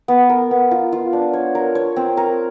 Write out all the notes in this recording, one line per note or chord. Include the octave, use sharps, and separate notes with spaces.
B3
A#4
B3
F4
F4
D4
C#5
A#4
C#5
C4
A#4